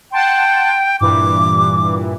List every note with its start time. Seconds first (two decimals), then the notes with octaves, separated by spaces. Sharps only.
0.12 F#5 G5 A5 C6
1.01 G2 A#2 E3 D6